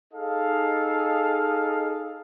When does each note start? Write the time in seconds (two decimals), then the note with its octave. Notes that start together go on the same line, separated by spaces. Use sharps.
0.14 D#4 G#4 A4 D#5 F5